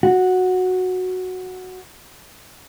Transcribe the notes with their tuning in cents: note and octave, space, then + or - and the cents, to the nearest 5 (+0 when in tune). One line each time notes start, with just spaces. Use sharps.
F#4 -5